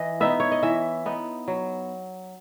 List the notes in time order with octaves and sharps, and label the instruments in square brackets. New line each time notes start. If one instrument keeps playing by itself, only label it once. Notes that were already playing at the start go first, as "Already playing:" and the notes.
Already playing: [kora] E3 D#5
B3 D#4 E5
C#5
D#5
E3 E5
B3 D#4
F#3